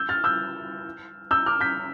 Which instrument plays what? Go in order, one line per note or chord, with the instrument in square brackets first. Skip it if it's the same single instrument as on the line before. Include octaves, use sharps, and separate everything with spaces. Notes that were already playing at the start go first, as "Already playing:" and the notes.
Already playing: [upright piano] E6 G6
F6 A6
E6 G6
E6 G6
D6 F6
G6 B6